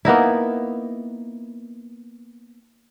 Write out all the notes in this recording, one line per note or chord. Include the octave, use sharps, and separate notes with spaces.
A#3 B3 D#4 E4